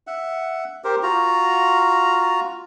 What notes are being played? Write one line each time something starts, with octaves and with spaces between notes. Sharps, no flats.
E5 F#5
G4 A#4 C5
F4 F#4 A#5